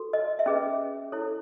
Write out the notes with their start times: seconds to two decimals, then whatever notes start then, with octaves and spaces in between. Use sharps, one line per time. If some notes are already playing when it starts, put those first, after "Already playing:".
Already playing: F#4 A4
0.13 D#5
0.39 E5
0.46 C#4 G#4 B4 D#5
1.12 E4 A4 C#5